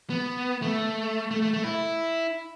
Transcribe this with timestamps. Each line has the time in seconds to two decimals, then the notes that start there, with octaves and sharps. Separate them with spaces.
0.10 B3
0.62 A3
1.31 A3
1.42 A3
1.53 A3
1.64 E4